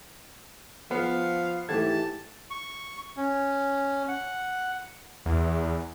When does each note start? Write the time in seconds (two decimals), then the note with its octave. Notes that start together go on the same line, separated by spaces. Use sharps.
0.91 F3 B3 F5
1.69 G#2 E3 A3 G4 A5 G#6
2.50 C#6
3.17 C#4
4.08 F#5
5.26 E2